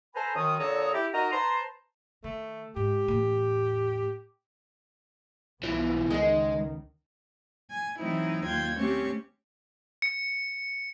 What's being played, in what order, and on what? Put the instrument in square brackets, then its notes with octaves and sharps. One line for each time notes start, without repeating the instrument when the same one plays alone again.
[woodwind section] A4 B4 C5 G#5 A#5 B5
F#2 D#3 D#6
A#2 D3 A4 C#5 A#5 D#6
E4 G4
D#4 F#4 A#4 D#5 A#5
B4 C5 A5 A#5 C6
[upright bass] D#3 [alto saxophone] A3
[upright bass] G#2 [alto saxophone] G4
[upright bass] E2 A2
[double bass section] B1 B2 B3 [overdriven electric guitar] E3 F3
[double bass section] C#2 D#3 [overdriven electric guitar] G#3 [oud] D#4 G#4
[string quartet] G#5
E3 F#3 A3 C4 D#4 E4
D#2 F4 G5 G#6
A3 C4 C#4 G4 C#6
[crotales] C#7